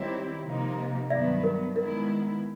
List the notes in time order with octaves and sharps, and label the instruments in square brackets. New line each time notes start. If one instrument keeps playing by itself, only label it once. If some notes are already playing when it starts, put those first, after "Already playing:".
Already playing: [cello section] D#3 G3 C4 E4 G4 [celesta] C#5 D#5
[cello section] C3 F3 A#3 D#4
[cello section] G2 D#3 F#3 B3 [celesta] D5 E5
[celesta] A#4
[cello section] D#3 G#3 B3 E4 [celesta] A#4